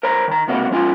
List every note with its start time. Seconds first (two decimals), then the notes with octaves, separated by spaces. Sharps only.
0.03 A#4 C5 C#5 A#5
0.28 D#3 A#5
0.48 C#2 C3 A#3 F#4 C#5
0.71 F3 C#4 F4 G#5